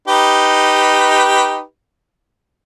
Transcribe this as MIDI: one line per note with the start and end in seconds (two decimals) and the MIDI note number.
0.08 1.62 63
0.08 1.62 67
0.08 1.62 71